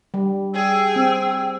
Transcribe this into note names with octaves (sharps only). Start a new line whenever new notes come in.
G3
G#4 G5 E6
C4